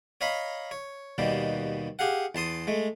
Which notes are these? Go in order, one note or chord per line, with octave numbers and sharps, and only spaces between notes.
C#5 D#5 F5 A#5 B5
C#5
D#2 B2 D#3 G3 A#3
G4 G#4 F5 F#5
E2 A5 C6 D#6
G#3 A3